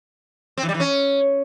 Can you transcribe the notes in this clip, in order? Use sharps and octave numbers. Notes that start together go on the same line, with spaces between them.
C4
E3
G3
E3
C#4